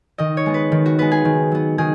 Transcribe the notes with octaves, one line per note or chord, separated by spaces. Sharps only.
D#3 D#5
C#5
G#3 B3
B4
D#3
F#4
G#3 B3 B4
G#4
D#3
F#3 B3
D#3 G#4